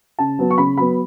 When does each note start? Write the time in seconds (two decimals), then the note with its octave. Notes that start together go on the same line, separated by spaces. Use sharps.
0.19 C#3 A5
0.39 F#3 B3
0.50 C#6
0.58 C#3 B5
0.77 F#3 B3 B5